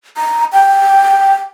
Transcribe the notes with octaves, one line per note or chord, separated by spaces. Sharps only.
A#5
G5